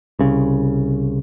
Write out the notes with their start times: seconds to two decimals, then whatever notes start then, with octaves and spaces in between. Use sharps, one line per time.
0.19 C2 C#3